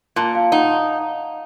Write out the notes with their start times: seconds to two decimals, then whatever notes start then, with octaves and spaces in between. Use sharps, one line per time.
0.16 A#2 A5 C6
0.35 F5 A5
0.52 D#4 F#5 A#5